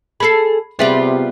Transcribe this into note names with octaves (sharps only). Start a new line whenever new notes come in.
G#4 A4 B5 C7
C3 G3 B3 F4 G#4 E5 F#7